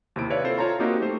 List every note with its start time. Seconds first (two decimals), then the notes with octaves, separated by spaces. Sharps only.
0.16 D#2 C3 C4 E4 D7
0.30 B4 C#5 D5 E5 F5
0.44 C4 E4 F4 A4 C5
0.58 F4 C5 C#5 A5 A#5 C6
0.79 A#3 C4 D#4 F#4 G4 A#4
1.02 A3 C5